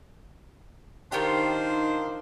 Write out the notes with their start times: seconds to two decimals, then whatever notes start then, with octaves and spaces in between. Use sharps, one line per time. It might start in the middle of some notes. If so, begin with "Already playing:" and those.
1.12 D#3 D4 D#4 F4 G4 C5